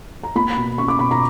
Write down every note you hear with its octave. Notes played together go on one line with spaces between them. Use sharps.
A#5
A#3 B5
B2
C#4 C#6
D6
B2 B5
A#5